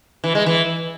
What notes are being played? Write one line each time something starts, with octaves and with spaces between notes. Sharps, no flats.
E3
G#3
E3